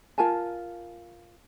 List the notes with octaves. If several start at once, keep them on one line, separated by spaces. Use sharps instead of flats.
F4 A#4 G#5 A5